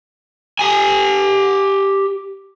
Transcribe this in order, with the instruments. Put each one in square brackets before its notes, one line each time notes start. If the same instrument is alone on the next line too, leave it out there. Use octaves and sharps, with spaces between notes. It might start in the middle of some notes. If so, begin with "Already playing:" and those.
[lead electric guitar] G4 G#5